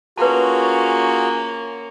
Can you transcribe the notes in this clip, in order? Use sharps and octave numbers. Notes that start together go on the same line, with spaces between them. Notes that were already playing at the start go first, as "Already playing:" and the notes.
A#3 C#4 F4 F#4 G#4 B4 A5